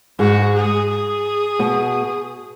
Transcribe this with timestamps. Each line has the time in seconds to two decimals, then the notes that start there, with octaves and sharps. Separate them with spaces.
0.19 G#2 G#3 F#4
0.55 G#4
0.89 G#4
1.59 B2 B3